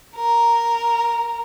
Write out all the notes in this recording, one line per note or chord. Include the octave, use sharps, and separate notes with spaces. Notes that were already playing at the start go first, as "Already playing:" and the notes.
A#4